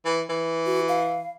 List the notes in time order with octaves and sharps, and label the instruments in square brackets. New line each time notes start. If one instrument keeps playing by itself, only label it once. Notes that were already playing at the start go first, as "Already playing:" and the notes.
[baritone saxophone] E3
E3
[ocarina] F#4
F5